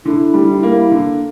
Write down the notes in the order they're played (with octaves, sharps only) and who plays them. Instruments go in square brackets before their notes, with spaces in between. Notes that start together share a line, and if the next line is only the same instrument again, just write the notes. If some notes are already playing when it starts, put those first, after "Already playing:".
[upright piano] D3 [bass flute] E4
[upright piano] G3
[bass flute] E4
[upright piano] A#3
D3